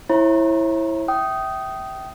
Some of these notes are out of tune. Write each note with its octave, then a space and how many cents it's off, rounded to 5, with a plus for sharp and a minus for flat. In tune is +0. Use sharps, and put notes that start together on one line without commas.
E4 +0 C#5 -40 A#5 +40
E5 +0 G5 -25 D#6 +0